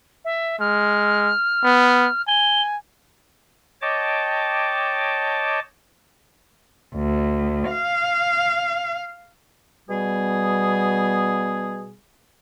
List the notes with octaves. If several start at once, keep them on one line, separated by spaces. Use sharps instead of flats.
E5
G#3 F6
B3
G#5 G7
C#5 D#5 G5 A5 D6
D2
F5
B2 G3 B3 G#4